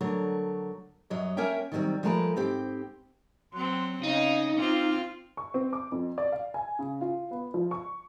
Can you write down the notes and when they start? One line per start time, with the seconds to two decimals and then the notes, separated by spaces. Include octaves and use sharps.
0.01 D3 F#3 A3 A#4 C#5
1.10 F#2 F#3 C#5 D#5
1.37 A#3 C#4 A#4 C#5 E5 G5
1.72 D#3 F#3 G3 A#3 C4
2.03 F3 G#3 A3 G4 A#4 B4
2.36 G#2 C4 G4 G5
3.54 F#3 C4 C6 F#6
4.03 C#3 D#4 D#5 F5
4.58 C4 F4 F5 D6 F6
5.37 C#6
5.54 C4
5.73 D6
5.92 F2
6.18 D5
6.32 F5
6.54 G#5
6.79 C#3
7.01 F4
7.31 B3
7.54 F3
7.71 C#6